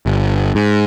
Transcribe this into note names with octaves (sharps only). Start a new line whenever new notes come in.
G1
G#2